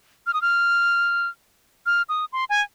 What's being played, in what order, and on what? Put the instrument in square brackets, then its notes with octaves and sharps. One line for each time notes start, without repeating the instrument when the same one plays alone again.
[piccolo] F6
D#6
F6
F6
D#6
C6
G#5